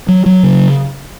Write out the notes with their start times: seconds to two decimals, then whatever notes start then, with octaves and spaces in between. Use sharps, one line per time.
0.08 F#3
0.26 F#3
0.43 C#3